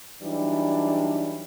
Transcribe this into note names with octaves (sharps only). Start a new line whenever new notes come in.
E3 F#3 G3 D4 D#4